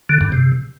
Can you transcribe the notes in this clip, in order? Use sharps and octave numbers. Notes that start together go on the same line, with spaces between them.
D3
G2
C3